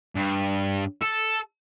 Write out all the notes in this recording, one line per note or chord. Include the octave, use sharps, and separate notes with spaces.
G2
A4